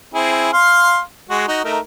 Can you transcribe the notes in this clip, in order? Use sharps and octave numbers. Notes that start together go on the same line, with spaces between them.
C4 E4 G#4
F5 C6
G#3 F#4
D#4 F#4
A3 D#4 A#4